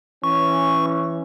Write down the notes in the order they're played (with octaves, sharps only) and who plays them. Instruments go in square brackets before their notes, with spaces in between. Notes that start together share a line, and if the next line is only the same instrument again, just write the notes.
[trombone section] E3 C#4 [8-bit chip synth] C#6